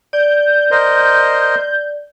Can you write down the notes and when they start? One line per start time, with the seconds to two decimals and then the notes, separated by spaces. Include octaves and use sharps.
0.13 D5 G6
0.71 A#4 C5 D#5